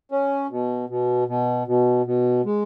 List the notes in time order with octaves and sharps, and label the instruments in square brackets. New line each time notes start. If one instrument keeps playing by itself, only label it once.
[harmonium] C#4
B2
B2
B2
B2
B2
G#3